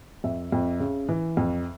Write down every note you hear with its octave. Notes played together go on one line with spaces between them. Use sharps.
F2 E5
F2
C#3
E3
F2